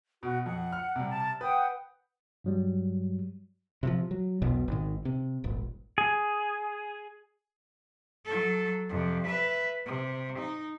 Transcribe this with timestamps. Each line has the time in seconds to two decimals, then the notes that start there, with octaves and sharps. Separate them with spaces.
0.23 B2 F#4
0.46 F2 F#5
0.73 F6
0.96 C3 G3
1.08 A5
1.41 B4 F#5 G5 D#6
2.44 G2 F#3 G3
3.83 C3 E3 F3
4.11 F#3
4.42 E1 B1 B2
4.68 G#1 D#3
5.05 C3
5.44 D#1 G#1
5.98 G#4
8.25 F#3 A4
8.89 F2 C3
9.27 B4 E5
9.86 C3
10.38 D#4